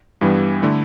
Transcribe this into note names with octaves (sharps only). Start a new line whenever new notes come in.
G2 E3 G3 B3
D3 A3 E4